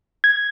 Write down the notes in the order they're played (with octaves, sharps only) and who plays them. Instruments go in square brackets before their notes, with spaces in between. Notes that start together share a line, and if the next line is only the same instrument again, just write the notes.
[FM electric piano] G#6